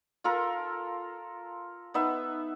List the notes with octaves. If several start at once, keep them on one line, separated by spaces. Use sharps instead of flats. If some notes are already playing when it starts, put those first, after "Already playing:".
F4 A4 A#4
B3 D#4 E5